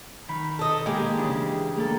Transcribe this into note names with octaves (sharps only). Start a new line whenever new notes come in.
D#3 B5
A4 D#5
G#3 A#3 G4 G#4
C#3 E3 D4
A#3 A4